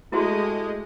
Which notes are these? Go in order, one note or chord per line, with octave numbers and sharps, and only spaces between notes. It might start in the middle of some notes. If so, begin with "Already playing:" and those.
G#3 A3 E4 F#4 G4 D#5 C6